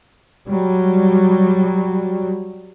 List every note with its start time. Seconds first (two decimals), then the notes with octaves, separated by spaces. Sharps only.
0.49 F#3 G3